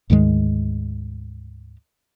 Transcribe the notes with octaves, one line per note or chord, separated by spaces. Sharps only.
D2 G#2 D#3 G#3